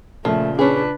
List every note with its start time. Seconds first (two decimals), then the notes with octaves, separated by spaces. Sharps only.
0.25 A#2 C#3 F3 A3
0.59 C#4 D4 G#4 B4